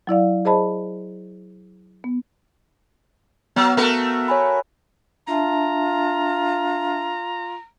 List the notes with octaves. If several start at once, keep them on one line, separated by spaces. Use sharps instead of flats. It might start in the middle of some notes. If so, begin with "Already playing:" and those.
F#3 E4 D5 F5
G#4 C5 D#5 A5 B5
B3
F#3 B3 F6
A3 F#4 A#4
C#5 G#5 B5
D4 F4 E5 A5 A#5